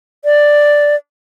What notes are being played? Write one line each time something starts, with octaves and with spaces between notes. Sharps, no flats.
D5